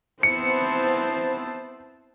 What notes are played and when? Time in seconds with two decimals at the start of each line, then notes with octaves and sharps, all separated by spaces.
0.23 B3 C4 E4 C5 A5 C#7